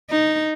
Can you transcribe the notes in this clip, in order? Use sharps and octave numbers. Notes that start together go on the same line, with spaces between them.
D#4